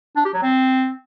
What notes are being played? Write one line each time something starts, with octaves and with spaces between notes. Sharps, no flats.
D4
G4
F#3
C4